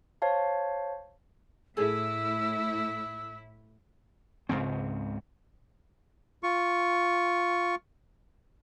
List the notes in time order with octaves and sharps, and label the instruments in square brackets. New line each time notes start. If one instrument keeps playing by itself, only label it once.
[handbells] C5 C#5 F5 A5
[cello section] A2 E4 [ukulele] G#4 A4 [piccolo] E6
[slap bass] C#2 G#2 C#3 C4
[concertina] F4 C#6